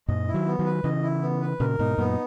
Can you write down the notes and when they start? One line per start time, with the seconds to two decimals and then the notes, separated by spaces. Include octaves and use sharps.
0.08 F#2 A#2 D#5
0.28 E4
0.34 D#3 F#3
0.46 B3
0.59 D#3 F#3
0.65 B4
0.84 C#3 E3 D#5
1.03 E4
1.22 B3
1.41 B4
1.60 A#2 C#3 A#4
1.79 G#2 B2 D#4
1.98 F#2 A#2 B3